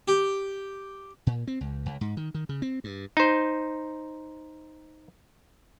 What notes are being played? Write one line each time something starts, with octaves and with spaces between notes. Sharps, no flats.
G4
A#2
C4
C#2
C#2
G#2
D#3
D#3
C#3
C4
G2
D#4 C5